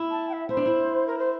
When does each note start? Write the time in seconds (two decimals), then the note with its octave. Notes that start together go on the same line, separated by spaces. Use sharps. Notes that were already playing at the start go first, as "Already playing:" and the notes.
Already playing: E4
0.11 A5
0.29 G5
0.33 E5
0.49 E4 C5
0.57 D4
0.66 E4
1.07 A#4
1.19 C5